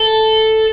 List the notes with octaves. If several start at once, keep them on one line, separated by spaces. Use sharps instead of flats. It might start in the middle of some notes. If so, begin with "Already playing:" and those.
Already playing: A4